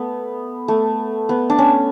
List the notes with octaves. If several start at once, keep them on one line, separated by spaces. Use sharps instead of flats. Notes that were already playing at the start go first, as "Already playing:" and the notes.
Already playing: A3 B3
A3
B3
D4
C#4